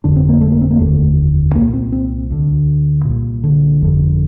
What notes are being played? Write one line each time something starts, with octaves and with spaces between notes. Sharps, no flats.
G1 F2 D3 D4
C4
A#3
A3
A#3
C4
A#3
F1 D#2 D3 A3
C2 A#2 A#3
C4
C4
D2 D3
C2 A#2
D3
G1 F2 D3